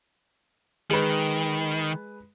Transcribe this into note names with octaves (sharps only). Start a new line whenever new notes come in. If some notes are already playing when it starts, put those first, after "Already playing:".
D#3 G#3 B4